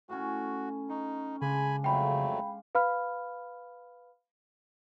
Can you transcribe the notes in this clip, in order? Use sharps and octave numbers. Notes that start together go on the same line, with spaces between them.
A2 C#4 F#4
D#4 C#6
C#3 G#3 D4 G#5 B5
F2 F#3 A3 F5 G5 B5
B4 F5 B5 F6